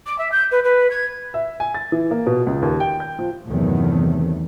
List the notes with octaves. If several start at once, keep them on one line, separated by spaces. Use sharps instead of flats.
D6
E5
G6
B4
B4
G#6
E5
G#5
A6
E3
A#3
B2
C#2
D#2
G5
G6
F3
E2 G2 C3 D#3 F#3 A3